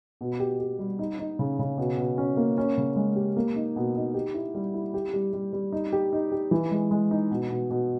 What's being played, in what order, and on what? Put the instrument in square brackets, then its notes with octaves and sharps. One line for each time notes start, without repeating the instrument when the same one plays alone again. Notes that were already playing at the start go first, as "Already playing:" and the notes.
[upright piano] B2
G4
G4
G3
D#4
D#4
C#3
C#3
B2
B2
C#4
A#3
C#4
C#3
G#3
G4
A#3
D#4
B2
D#4
G4
E4
G3
E4
G4
G3
G3
G3
D#4
G4
D#4
G4
E3
G#3
G#3
D#4
B2
B2
B2